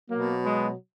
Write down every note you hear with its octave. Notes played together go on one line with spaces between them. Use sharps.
B2 F#3 A#3
G#3 B3